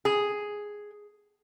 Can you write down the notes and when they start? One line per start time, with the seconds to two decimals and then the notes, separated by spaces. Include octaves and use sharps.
0.05 G#4